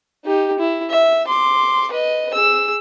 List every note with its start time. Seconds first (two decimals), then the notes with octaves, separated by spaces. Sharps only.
0.25 D#4 G4
0.59 E4
0.90 E5
1.27 C6 D6
1.91 B4 D#5
2.34 G#4 E6